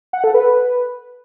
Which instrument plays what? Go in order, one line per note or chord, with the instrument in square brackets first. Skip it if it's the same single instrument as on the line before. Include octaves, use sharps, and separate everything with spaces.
[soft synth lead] F#5
A4
B4